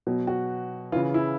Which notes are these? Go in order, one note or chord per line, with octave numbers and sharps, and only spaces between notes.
B2 F#3
F#4
C#3 E3 F4
E4